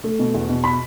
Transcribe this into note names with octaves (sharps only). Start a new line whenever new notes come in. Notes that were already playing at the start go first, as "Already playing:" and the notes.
A3
B2
E2
B2
B5